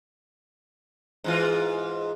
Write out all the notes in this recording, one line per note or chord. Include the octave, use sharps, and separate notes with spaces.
G#2 E3 F4